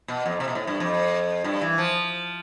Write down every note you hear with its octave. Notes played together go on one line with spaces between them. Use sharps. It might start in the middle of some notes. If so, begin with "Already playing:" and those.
B2
F2
C3
B2
A2
G2
F2
G2
E3
F3